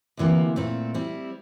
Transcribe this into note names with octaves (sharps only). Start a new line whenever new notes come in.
D2 C3 E3 A#3
A#2 A3 C4
G3 C4 E4